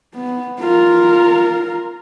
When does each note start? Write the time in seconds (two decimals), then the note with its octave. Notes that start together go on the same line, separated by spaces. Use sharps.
0.15 B3
0.60 F4 A#4